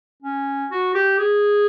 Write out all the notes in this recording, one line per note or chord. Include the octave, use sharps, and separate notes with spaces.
C#4
F#4
G4
G#4